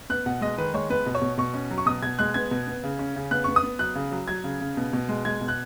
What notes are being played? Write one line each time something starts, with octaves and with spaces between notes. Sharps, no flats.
B3 F#6
B2 F#5
G#3 D#5
D#3 B4
G#3 C#5
B3 B4
B2
C#5
B2
B2 C#6
C#4
F#3
C#6
B2 D#6
B2 G#6
G#3 F#6
B3 G#6
B2
B3
C#3
C#4
C#3
B3 F#6
B3 C#6
D#6
B3
F#3 F#6
C#3
F#3
F#3 G#6
C#3
C#3
B2
B2
G#3
G#3 G#6
B2
F#6